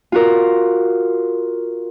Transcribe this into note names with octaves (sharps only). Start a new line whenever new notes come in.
F4 F#4 A#4